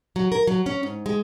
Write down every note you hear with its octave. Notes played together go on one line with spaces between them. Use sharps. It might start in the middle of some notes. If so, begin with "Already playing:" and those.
F#3
A#4
F#3
C#4
G#2
G#3